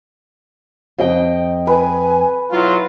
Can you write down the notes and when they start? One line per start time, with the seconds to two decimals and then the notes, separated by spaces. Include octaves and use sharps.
0.98 F2 D#5 G5
1.67 B4 G#5
2.51 B1 F#3 E4 F4